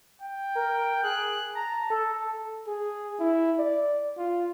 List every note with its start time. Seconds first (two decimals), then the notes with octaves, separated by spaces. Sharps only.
0.21 G5
0.55 A#4
1.04 G#4 F#6
1.55 A5 A#5
1.90 A4
2.67 G#4
3.19 E4
3.59 D5
4.18 F4